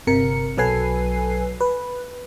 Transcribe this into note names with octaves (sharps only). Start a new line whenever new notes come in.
G1 C3 A#4 C#7
B1 F#3 A4 B4 G#5 C7
B4